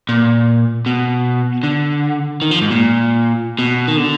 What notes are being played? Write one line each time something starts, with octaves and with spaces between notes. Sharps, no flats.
A#2
B2
D3
D#3
F3
G#2
A#2
B2
D#3
D3